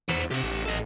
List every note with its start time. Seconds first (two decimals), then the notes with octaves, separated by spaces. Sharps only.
0.09 E2 C5 F#5
0.31 C3 G4 F#5
0.43 A1
0.65 A4 D#5